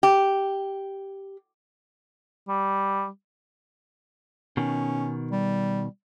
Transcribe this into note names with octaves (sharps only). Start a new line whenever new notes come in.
G4
G3
B2 D#3 C#4
G3